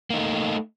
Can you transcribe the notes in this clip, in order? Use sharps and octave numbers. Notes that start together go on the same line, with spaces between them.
A3 A#3 D#4